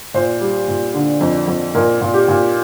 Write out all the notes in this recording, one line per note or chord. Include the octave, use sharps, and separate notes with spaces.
A#2 C5
G3
A#2
D3
F2
F2
A#2 A#4
A#2
G4
A#2